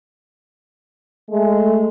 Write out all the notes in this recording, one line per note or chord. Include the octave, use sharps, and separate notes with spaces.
G#3 A3